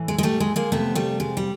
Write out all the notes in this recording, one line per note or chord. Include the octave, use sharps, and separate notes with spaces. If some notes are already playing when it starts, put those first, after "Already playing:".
Already playing: A2 E3
G#3
G#3
G3 A3
G#3
G#3 A#3
C3 F3 A3 B3
G3 A3
G#3
G3